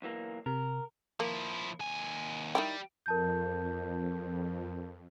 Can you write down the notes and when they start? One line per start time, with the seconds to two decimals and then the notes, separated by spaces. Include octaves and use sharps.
0.02 B1 E3 A#3
0.46 C3 A#4
1.20 F3 A#3 E4
1.80 D#2 G#5
2.55 D#3 G3 E4 G5
3.06 F2 A#4 A5 G6